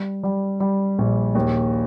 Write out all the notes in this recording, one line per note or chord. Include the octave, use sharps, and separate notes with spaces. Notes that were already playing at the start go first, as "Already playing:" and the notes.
Already playing: G3
G3
G3
A#1
D#2